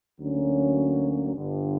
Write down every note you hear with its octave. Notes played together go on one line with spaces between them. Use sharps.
D2 D3 F#3 A#3 C#4
G1 G2 D3